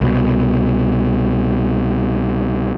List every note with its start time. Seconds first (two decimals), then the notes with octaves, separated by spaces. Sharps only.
0.01 C2 B2